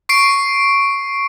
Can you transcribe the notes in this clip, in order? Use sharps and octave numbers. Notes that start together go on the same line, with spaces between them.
C#6 C7 D7